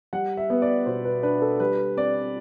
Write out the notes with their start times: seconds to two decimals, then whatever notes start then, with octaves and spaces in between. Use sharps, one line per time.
0.13 G3 F#5
0.37 E5
0.50 B3
0.62 D5
0.86 B2 C5
1.05 B4
1.23 D4 B4
1.42 A4
1.60 G3 B4
1.97 C4 D5